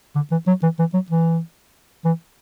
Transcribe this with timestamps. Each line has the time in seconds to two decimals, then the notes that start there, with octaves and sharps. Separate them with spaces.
0.15 D3
0.31 E3
0.47 F#3
0.63 E3
0.79 E3
0.93 F#3
1.10 E3
2.04 E3